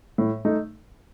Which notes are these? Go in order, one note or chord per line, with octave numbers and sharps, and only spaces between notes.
A2
A3 D#4